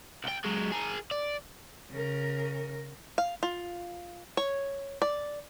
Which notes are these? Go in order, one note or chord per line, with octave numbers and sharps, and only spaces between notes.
C2 G5
F#3 G#3
G#4 A#4
D5
C#3 A#4
F5
F4
C#5
D5